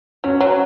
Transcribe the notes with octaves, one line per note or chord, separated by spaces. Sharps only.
F#3 C#4
F#3